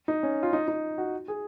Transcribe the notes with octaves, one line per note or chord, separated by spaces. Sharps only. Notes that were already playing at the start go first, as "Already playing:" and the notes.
D#4
C#4
F4
D#4
D#4
F#4
G#4